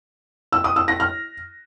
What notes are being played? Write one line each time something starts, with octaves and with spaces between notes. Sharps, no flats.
E6
D#6
E6
A#6
F6